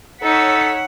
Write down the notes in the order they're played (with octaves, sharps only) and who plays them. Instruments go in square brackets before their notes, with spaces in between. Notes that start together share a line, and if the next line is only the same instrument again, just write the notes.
[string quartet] D#4 [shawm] A4 [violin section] C#5 E6 B6 [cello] F#5